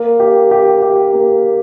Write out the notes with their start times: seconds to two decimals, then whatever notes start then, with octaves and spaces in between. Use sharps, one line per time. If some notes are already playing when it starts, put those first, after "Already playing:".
Already playing: A#3
0.20 G4
0.51 G4
0.82 G4
1.13 A#3